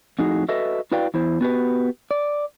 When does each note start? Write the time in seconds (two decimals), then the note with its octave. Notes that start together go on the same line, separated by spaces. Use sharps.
0.19 F2 A2 D#4 F#4 G#4
0.49 F#4 A4 B4 D#5 E5
0.92 E4 F#4 B4 D5 F5 G5
1.14 E2 E4 C5
1.41 B3 F#4 G4 B4
2.11 D5